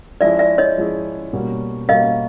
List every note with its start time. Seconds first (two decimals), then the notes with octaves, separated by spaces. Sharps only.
0.21 F3 G#3 C#4 E4 G#4 D5 E5
0.39 D5 E5
0.58 C#5 D#5
0.77 F3 G#3 C#4 E4 G#4
1.33 B2 G3 A#3 C#4 F#4
1.89 B2 G3 A#3 C#4 F#4 D#5 F5